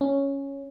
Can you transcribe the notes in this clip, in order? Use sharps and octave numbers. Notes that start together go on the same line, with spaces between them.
C#4